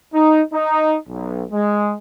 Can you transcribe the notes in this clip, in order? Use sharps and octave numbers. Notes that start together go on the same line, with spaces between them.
D#4
D#4
B1
G#3